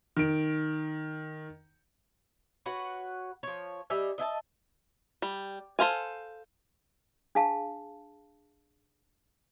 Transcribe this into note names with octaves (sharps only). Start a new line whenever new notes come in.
D#3 D7
F#4 B4 C#5 F#5
F3 C#5
G3 D#5 E5 G#5
D#5 E5 G#5 A5
G3
A4 C5 F5 G#5
D4 G#4 F5 A5